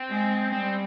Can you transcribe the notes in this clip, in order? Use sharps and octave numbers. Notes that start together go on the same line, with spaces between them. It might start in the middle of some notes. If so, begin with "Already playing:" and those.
Already playing: C4
G#3
G3 C4